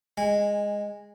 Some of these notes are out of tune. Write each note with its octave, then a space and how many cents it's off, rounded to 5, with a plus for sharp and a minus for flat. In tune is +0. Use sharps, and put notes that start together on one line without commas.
G#3 -10 G#5 -25